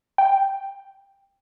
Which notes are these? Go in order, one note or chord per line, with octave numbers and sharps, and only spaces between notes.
G5